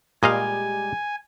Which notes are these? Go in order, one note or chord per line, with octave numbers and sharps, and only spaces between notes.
A#2 G3 G#3 G4 D#5 F5 G#5